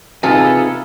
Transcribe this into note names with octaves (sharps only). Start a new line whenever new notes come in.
E2 C3 D#4 F4 G#4 A4 B4 G#5